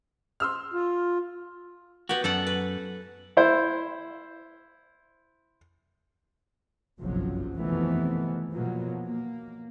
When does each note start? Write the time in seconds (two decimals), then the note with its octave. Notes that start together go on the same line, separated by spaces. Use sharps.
0.40 C6 E6 F6
0.73 F4
2.09 B3 F#4 G4
2.24 F#2 A4 D5 F#5
2.47 B4
3.37 E4 C5
7.01 F#1 B1 G2 C3 F3 F#3
7.56 F2 C3 D#3 E3 A3 B3
8.52 B2 F3 F#3 A#3
9.05 A#3